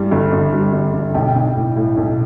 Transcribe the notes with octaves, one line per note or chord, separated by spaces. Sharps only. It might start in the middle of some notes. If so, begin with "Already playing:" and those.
Already playing: G2 E3 G3
G1
G1
G3
G1
G1
B1 G5
B1
A2
A2
B1